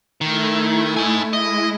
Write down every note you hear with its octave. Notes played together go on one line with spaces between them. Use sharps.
D#3 A3 E4
D#4 G#5
G#3 E4 D#5